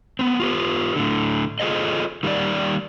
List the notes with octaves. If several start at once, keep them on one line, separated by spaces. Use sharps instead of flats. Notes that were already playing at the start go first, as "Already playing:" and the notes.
B3 C4
F4 G4 B4
A2 D3
F4 G#4 A4 C5 D#5
D#3 G3 A#3 D4 D5